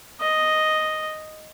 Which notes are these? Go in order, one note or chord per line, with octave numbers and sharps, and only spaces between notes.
D#5